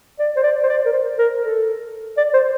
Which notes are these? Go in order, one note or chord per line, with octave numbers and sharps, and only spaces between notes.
D5
C5
D5
C5
D5
A#4
C5
A#4
A4
D5
C5